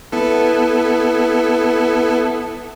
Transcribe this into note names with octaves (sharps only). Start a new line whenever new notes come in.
B3 E4 A4